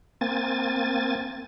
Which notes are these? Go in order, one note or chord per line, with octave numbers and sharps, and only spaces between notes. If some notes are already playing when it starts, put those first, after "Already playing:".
A#3 C4 G#5 A6